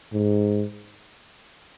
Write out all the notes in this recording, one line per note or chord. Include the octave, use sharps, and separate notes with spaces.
G#2